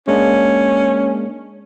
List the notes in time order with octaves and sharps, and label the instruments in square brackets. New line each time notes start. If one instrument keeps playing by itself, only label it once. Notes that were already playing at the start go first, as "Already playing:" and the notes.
[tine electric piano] G#3 A#3 D4 [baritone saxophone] C#4